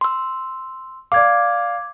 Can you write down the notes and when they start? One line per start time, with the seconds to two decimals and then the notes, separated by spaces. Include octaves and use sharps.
0.01 C6 E6
1.12 D5 F5 D6 G#6